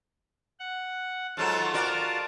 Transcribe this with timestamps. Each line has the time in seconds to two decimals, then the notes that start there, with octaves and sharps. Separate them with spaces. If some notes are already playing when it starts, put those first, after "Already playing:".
0.60 F#5
1.37 G#2 F#3 F4 A4 A5
1.74 F#4 A#4 D5